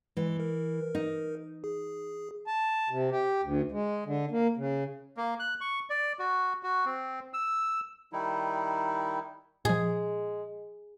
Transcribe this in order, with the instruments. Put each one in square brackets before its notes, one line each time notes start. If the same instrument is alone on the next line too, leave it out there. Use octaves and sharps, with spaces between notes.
[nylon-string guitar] E3 [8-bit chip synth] G#3
[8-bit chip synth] A#4
[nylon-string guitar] D#4
[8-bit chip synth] G#4
[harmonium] A5
C3
G4
D2
G#3
D3
A#3
C#3
[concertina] A#3
F#6
C#6
D5
F#4
F#4
C4
E6
[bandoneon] D#3 G3 D#4 E4
[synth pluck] A#2 F3 [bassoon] G#3 [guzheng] G#4